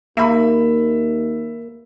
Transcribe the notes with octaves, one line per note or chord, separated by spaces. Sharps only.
D#2 A#3 E5 B5